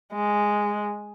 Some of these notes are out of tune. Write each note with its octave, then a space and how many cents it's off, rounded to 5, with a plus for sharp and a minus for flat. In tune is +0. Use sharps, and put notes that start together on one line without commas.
G#3 -5